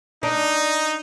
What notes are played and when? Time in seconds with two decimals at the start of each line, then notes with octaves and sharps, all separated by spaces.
0.23 D4 D#4